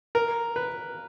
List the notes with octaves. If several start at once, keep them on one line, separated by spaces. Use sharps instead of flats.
A#4
B4